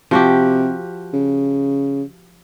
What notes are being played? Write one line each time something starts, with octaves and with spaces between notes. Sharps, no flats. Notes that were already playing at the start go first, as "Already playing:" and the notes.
C3 F3 F#4 G4
C#3